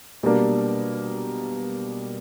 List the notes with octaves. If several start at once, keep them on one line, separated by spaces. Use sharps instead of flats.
B2 G3 A#3 D4